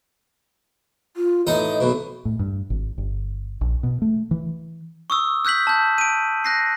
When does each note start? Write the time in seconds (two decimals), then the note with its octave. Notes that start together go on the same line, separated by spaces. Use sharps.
1.17 F4
1.47 A1 D#4 D#5 A5
1.80 B1 B2
2.25 A2
2.39 G2
2.70 G#1
2.98 G1
3.61 A#1
3.83 B2
4.02 A3
4.31 E3
5.10 C#6 D#6 E6
5.45 E6 F#6 G6 B6 F#7
5.67 A5 G6
5.98 D7 D#7
6.44 F#6 A#6 C7